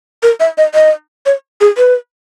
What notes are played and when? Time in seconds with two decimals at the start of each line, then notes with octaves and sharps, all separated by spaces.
0.23 A#4
0.40 E5
0.58 D#5
0.74 D#5
1.26 C#5
1.61 G#4
1.77 B4